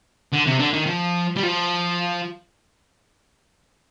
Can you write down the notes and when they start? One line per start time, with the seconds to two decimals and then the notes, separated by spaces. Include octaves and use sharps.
0.32 D3
0.46 C3
0.59 D3
0.73 D#3
0.87 F3
1.36 G3
1.43 F3